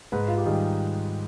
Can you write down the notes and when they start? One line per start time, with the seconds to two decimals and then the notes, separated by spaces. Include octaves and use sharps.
0.12 G#2 B4
0.28 F4
0.37 G4
0.46 D#3 G3 G#4